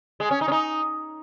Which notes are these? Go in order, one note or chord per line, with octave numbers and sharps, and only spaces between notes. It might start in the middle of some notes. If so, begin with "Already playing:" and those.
G#3
C#4
D#4
C#4
D#4